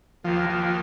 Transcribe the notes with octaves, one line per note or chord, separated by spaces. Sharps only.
D#2 D#3 F3
F3